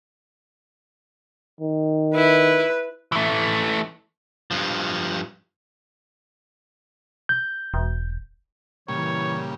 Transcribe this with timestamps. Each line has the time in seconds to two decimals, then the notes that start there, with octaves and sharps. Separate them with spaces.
1.61 D#3
2.15 E4 B4
3.12 E3 A3
4.51 G2 F3
7.29 G6
7.74 E1
8.88 A#2 C#3 E3 G3 C#5